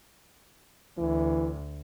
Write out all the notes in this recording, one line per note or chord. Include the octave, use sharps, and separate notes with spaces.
D2 E3